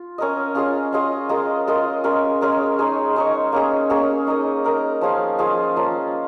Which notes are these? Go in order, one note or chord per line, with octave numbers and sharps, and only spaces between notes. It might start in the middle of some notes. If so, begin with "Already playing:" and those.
Already playing: F4
C#4 A#4 D#5
C#4 F4 G#4 D#5
C#4 F4 G#4 D#5
G#3 F4 A#4 D#5
G#3 F4 A#4 D#5
G#3 C#4 A#4
G#3 C#4 A#4
G#3 D#4 C#5
G#3 D#4 C#5
A#3 C#4 G#4 C#5
A#3 C#4 G#4 C#5
D#4 A#4 D#5
D#4 A#4 D#5
F3 C#4 F4 G#4
F3 C#4 F4 G#4
F3 A#3 C#4